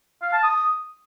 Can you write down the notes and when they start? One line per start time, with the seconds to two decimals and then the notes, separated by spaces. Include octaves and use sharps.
0.22 F5
0.33 A5
0.43 D#6